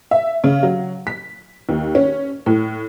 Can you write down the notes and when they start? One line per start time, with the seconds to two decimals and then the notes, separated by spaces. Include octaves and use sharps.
0.11 E5
0.44 C#3
0.63 F#3
1.07 B6
1.69 D#2
1.95 C#4
2.46 A2